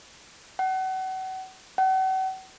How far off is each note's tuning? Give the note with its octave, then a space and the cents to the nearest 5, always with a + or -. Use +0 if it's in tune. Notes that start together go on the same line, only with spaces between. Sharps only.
F#5 +35
F#5 +40